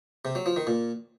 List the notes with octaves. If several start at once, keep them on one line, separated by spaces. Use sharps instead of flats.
C3
F#3
F3
D#3
A#2